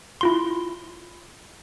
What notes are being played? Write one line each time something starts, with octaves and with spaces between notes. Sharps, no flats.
E4 F4 C6